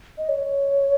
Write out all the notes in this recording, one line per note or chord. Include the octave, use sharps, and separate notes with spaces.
D#5
C#5